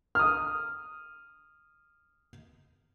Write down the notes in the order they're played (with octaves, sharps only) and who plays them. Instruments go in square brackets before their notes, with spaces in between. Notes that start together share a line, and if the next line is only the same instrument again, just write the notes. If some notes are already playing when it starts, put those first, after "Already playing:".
[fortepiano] D#6 F6